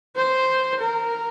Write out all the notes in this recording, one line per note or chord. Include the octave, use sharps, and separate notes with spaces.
C5
A#4